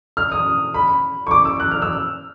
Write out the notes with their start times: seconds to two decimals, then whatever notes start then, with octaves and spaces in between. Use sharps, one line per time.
0.17 F6
0.32 D#6
0.74 B5
1.27 C#6
1.31 D6
1.45 E6
1.60 F#6
1.71 F6
1.82 E6